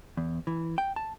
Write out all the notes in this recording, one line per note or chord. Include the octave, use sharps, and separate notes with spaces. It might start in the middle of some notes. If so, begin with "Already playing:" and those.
E2
E3
G5
A5